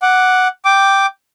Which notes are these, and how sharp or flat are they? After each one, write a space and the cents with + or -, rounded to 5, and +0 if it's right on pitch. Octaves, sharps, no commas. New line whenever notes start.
F#5 +0 D6 +0
G5 +0 D6 +0